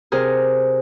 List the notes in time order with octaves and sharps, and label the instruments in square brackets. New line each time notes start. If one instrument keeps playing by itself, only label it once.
[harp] C3 G#4 A#4